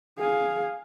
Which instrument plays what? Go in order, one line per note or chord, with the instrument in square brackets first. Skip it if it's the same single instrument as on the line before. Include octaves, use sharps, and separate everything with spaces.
[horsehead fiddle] G#4 F5